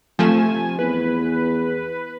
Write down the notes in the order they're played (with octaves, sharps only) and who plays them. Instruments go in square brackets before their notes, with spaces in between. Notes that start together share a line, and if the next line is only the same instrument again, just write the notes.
[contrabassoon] C3 [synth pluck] F3 A3 E7 [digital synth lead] G#5
[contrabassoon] E2 [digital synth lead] B4